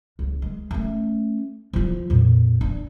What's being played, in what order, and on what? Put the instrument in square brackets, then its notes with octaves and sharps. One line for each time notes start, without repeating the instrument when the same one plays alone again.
[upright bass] C#2
G#3
A3 C#4
F3 F4
F2 A#2
D4